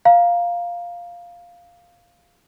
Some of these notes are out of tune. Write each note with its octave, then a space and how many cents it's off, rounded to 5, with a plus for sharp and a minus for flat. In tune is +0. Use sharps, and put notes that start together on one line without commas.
F5 +0 A#5 +5